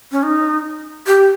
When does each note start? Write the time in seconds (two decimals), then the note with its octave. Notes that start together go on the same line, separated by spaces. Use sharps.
0.12 C#4
0.23 D#4
1.07 G4